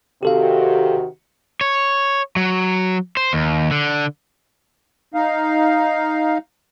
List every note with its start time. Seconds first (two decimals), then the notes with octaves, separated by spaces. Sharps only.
0.23 C3 D#3 F#4 G4 A4 F5
1.61 C#5
2.36 F#3
3.17 C5
3.33 D#2
3.71 D3
5.14 D#4 F5